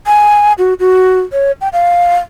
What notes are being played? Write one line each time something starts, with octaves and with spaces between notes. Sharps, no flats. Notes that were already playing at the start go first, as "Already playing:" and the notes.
G#5
F#4
F#4
C#5
G5
F5